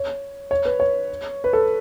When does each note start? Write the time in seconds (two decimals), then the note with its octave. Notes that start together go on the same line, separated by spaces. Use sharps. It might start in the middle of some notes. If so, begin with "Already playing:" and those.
Already playing: C#5
0.51 C#5
0.65 B4
0.80 C#5
1.44 B4
1.53 A4